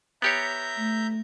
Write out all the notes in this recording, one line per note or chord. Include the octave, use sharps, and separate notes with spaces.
B3 G4 C#5 E5 A#5 G6
A3